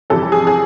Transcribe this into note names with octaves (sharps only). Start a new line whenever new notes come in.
F2 C3 E3 G3 A4
G#4
G#4